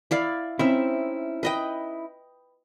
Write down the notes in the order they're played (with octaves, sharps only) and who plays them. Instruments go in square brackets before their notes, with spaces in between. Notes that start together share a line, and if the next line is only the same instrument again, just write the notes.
[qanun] E4 D5 F5
[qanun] C4 E5 [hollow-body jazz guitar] C#4 D#4 E4
[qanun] B4 D#5 G5